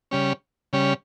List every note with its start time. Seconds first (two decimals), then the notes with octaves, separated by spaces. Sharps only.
0.11 C#3 G3 C#4
0.73 C#3 G3 C#4